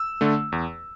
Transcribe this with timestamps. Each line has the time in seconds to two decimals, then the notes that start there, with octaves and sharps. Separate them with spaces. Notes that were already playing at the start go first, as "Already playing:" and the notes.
Already playing: E6
0.21 D3 A3
0.52 E2